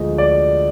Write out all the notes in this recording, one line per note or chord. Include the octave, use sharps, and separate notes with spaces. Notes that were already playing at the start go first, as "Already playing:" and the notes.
Already playing: D2 D3 F3 G#3 D#5
D5